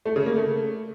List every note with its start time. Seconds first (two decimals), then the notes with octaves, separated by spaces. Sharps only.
0.06 A3
0.16 C#3
0.26 A#3
0.36 A3